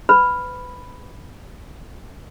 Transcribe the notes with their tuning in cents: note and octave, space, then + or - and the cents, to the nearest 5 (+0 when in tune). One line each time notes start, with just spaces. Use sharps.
B4 +30 B5 +0